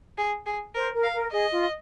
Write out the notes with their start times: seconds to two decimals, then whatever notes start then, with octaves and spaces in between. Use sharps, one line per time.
0.18 G#4
0.46 G#4
0.75 A#4 C5
0.94 A#4
1.03 F5
1.13 A#4
1.32 G#4 D#5
1.51 F4